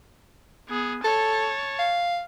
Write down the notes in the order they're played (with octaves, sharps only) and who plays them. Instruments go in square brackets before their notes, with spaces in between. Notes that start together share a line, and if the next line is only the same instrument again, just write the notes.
[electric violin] B3 G#4
[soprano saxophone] A4 [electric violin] C#5 A5
[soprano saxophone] F5